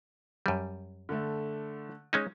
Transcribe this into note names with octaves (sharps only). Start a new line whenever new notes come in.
F#2 G3
D3 A3
G#3 C#4 D#4